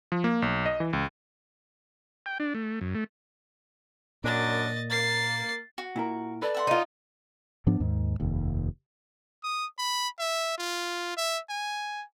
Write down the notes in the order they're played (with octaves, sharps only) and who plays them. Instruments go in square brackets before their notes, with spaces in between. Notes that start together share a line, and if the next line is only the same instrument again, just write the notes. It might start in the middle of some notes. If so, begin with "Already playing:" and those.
[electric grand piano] F3
A#3
B1
D#5
E3
C#2
[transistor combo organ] G5
D4
A3
F#2
A3
[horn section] F#2 D4 [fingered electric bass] A#2 [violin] D#5 A6
[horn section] A#3 [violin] A6 C7
[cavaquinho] F#4
[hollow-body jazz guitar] A#2 E4 A#4
[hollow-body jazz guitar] A4 B4 [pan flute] D5
[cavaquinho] E5 F#5 C6
[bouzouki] D#4 F4
[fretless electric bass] G#2 F3 B3 D4
D#2 G#2
F1 D#2
[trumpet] D#6
B5
E5
F4
E5
G#5